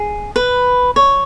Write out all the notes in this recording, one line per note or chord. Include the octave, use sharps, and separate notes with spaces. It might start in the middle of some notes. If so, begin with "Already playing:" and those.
Already playing: G#4
B4
C#5